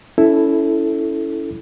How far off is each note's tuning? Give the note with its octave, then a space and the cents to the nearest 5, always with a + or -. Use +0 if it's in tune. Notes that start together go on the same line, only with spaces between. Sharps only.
C#4 +30 E4 +0 A4 -5